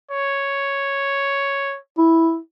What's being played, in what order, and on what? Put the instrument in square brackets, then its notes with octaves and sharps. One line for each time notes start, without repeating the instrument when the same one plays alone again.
[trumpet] C#5
[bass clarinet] E4